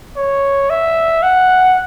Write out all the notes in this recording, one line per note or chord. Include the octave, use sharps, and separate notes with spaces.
C#5
E5
F#5